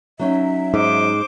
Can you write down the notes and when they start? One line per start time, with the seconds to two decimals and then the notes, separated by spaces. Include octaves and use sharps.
0.19 F#3 C#4 D#4 E5
0.74 G#2 C5 D6